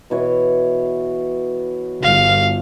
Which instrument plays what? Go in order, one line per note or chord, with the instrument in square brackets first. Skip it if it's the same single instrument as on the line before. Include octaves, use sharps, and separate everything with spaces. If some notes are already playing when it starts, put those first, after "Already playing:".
[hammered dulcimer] B2 E3 C#5
[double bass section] G1 [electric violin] F5